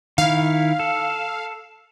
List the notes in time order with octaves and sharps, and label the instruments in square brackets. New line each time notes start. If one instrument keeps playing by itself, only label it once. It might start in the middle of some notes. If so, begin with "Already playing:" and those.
[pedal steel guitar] D#3 E4 [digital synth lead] F5
[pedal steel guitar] A4